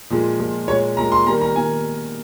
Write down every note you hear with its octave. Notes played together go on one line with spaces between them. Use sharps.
A#2 F3 G#3
A#2 F3 G#3
A#2 G#3 C#5
A#2 G#3 A#5
C6
D#3 G3 A#3 A#5
A#5
D#3 G3 A#3 G#5